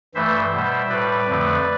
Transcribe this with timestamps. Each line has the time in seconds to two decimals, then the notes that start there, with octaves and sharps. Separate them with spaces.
0.15 G2 E3 A3 C5 E5
0.52 B2 G3
0.90 A2 G3 B4 D5
1.27 F2 D3 F3 A3